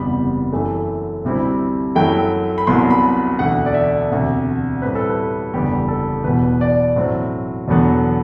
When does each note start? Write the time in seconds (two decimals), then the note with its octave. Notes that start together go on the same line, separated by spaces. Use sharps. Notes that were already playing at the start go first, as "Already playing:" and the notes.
Already playing: F#1 E2 C3 G3 B3 B5
0.52 F#2 E3 A3
1.24 D2 C3 G3 C4 E4
1.95 F#2 F#3 A3 E4 G5
2.58 B5
2.67 C2 C3 F#3 B3 E4 C6
2.90 B5
3.39 E1 D2 D3 A3 F#5
3.66 D5
3.74 E5
4.11 E1 D2 C3
4.82 A2 G3 C4 B4
4.95 A4
5.10 B4
5.53 F#1 E2 D3 G3 B3 G4
5.88 A4
6.24 E1 E2 B2 B4
6.61 D5
6.96 A2 F#3 C4
7.68 E1 E2 D3 F#3 B3